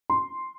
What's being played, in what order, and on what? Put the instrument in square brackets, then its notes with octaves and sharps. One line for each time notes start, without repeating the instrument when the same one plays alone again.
[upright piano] C6